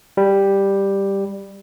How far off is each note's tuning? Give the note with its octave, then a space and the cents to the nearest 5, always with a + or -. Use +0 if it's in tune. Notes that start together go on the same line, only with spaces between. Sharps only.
G3 +5